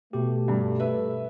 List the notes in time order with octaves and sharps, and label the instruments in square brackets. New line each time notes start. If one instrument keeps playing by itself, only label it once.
[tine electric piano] B2 G4 [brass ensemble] A3
[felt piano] G2
B4 E5